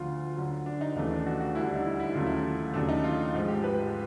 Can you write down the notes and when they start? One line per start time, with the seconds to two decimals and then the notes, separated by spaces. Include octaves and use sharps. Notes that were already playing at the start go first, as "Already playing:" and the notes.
Already playing: D2 D3 F3 F4
0.36 D2 D3 F#3
0.66 D4
0.81 D#4
0.96 D#2 C#3 E3 A3 D#4
1.11 D4
1.26 F#4
1.41 F#4
1.55 D2 D3 G3 E4
1.65 D4
1.75 D#4
1.86 E4
2.00 E4
2.13 D#2 C#3 F#3 A3 F4
2.26 E4
2.74 D#2 C#3 F#3 A3 D4
2.89 D#4
3.04 F4
3.34 G#2 F3 G#3
3.48 G4
3.64 B4